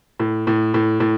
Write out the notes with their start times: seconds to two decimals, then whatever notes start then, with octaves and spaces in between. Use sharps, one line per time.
0.20 A2
0.47 A2
0.74 A2
1.00 A2